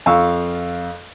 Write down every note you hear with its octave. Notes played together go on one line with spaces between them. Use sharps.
F2 F5 C#6 E6